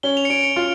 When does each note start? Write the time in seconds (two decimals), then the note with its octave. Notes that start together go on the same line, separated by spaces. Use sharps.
0.03 C#4 G7
0.17 F7
0.25 C#7
0.30 C#4 D7
0.43 C#7
0.56 F4